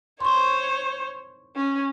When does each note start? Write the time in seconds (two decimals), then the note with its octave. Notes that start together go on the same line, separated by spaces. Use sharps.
0.20 C5 C#5 C6 C#6
1.56 C#4